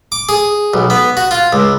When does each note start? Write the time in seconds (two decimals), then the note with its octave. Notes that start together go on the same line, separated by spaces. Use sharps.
0.12 D6
0.29 G#4
0.74 B1
0.90 B3
1.17 F#4
1.31 F4
1.53 C#2